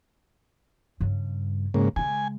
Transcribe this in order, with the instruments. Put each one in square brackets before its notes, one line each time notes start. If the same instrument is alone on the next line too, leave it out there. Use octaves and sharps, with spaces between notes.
[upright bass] G2 C#3
[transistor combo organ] G#2 C#3 A#3
[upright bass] C#3 G#3 [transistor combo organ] G#5